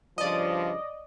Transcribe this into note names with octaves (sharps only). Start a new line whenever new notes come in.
G2 C#3 F3 D5 D#5